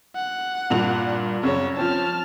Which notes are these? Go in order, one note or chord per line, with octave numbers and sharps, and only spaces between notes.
F#5
G2 A#2 F7
F#2 C#3 C#4 C#5
F3 C4 C#4 A5 F6